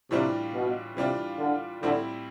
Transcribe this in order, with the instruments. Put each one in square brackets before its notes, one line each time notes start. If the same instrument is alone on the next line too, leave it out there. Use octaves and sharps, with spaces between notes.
[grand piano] A2 E3 G3 D4 F4 [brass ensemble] C3
[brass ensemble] B2
[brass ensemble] C3 [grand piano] E3 G3 D4 F4
[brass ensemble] D3
[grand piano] A2 G3 C4 E4 [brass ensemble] D3